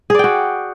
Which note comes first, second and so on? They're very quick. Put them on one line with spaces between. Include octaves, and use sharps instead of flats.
G#4 D5 G5 F#4